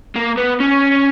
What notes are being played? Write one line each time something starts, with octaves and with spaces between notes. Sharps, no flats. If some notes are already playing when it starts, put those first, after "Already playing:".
A#3
B3
C#4